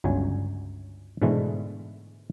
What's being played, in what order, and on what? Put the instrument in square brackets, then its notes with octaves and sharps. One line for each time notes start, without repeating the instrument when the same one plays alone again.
[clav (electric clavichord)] G1 C#2 F#3 G#5
G#2 B2 D3 E3 G#3 A3